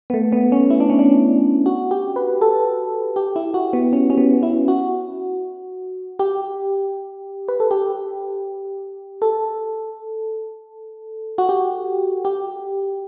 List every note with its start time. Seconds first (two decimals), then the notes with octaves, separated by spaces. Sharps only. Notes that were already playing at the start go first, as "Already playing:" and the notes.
0.10 B3
0.14 A3
0.32 B3
0.52 C#4
0.70 E4
0.80 D4
0.90 C#4
0.99 D4
1.66 F#4
1.91 G4
2.16 B4
2.41 A4
3.16 G4
3.36 E4
3.54 F#4
3.73 B3
3.93 C#4
4.10 C#4
4.17 B3
4.43 E4
4.68 F#4
6.19 G4
7.48 B4
7.60 A4
7.71 G4
9.22 A4
11.38 F#4
11.49 G4
12.25 G4